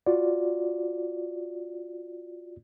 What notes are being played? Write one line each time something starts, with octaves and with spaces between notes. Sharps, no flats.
F4 F#4 D5